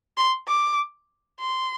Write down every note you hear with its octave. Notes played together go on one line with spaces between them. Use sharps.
C6
D6
C6